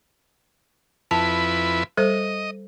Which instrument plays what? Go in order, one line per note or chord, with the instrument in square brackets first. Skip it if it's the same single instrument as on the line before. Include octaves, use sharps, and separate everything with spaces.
[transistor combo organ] F2 E4 B4 [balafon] A5
[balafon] G3 A4 C5 [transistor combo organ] D#5